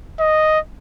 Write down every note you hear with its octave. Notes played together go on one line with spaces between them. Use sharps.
D#5